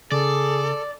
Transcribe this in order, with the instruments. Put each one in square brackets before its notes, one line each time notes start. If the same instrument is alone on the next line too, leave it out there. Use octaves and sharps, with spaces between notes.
[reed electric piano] C#3 [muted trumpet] G#4 [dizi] A4 [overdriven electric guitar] D5